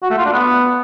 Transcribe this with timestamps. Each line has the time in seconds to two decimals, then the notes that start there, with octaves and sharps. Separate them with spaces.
0.03 F#4
0.10 A3
0.18 F4
0.25 D4
0.33 B3